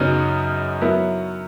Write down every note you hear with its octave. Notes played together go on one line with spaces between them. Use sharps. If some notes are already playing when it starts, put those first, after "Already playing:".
Already playing: F#2 C#3 F#3 B3 D#4
F#3 B3 E4 A#4